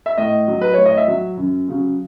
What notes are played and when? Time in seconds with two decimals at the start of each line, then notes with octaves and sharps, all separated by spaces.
0.06 E5
0.18 A2 D#5
0.48 F#3
0.61 B4
0.74 A2 C#5
0.86 D#5
0.97 E5
1.08 F#3
1.37 F#2
1.68 C#3 F#3